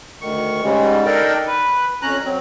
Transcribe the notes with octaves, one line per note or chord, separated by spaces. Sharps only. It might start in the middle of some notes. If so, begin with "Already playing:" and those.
D2 D#3 C#6
G#2 C#3 G3 G#3
D4 D#4 A4 A#4 D5 G5
B4
F2 C#4 A#5 F#6
F#3 C4